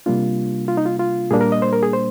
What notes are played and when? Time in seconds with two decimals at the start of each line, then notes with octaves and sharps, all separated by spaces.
0.06 C3 G3 A#3 D4 F4
0.68 F4
0.77 D#4
0.86 F4
0.99 F4
1.31 A#2 G3 A#3 D4 G#4
1.41 A#4
1.52 D#5
1.62 C5
1.73 A#4
1.83 G#4
1.93 C5